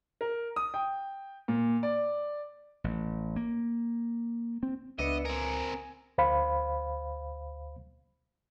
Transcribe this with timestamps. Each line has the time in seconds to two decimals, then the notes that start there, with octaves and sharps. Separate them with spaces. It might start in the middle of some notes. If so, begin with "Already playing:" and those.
0.21 A#4
0.56 D#6
0.74 G5
1.48 A#2
1.83 D5
2.84 A1
3.36 A#3
4.63 C4
4.99 C#2 B3 D4 B4 D#5 E5 C#7
5.25 C4 A#4 G#5
6.18 D2 C5 F5 B5